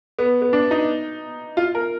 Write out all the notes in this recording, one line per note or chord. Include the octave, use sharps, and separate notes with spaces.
B3
B3
D4
D#4
F4
A#4